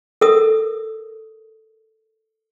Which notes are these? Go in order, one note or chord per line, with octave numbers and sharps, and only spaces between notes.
A4 A#4 D#6